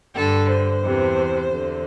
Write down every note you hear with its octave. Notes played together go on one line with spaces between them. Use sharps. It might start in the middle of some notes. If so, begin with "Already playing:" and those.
G2 D3 A4
C5
E2 C3 E3
E2 D3